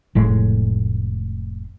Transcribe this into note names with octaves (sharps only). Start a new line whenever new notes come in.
F1 A2 G#3